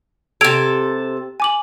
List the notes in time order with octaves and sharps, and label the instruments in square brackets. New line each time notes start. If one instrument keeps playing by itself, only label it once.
[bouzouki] C3 A4 [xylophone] G#6 D7 F7
[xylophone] G#5 D6 F#7